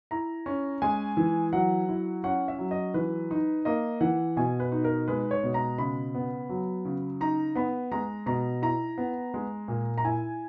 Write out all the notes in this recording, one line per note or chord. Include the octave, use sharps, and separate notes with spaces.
E4 A#5
C#4
G#3 G#5
E3
F#3 F#5
E4
C#4 F#5
E5
F#3
D#5
E3 B4
D#4
A#3 D#5
E3 F#5
B2 G#5
B4
D#4
A#4
G#3 B4
C#5
B2
A#5
C#3 B5
B3
F#3
C#3
D#4 A#5
B3 B5
G#3 A#5
B2 A#5
E4 A#5
B3
G#3
A#2
A#5
E4 G#5